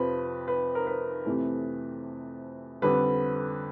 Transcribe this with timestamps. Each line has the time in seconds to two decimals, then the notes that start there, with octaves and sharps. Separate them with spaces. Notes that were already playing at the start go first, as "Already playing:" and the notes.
Already playing: F2 C3 F3 B4
0.48 B4
0.75 A#4
0.87 B4
1.26 F2 C3 E3 A3
2.82 F2 D3 G3 B4